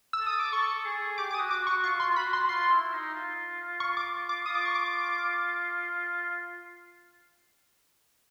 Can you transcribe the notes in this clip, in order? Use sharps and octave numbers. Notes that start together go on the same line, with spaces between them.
E6
A4
D#6
D6
A4 C#6
G#4
G4 D6
D6
G4 D#6
F#4
D6
F#4
C#6
F4 C#6
C6
F4
F#4 B5
C6
F4 C6
E4
D#4
F4
C#6
D6
D6
F4 D#6
D6
C#6
D6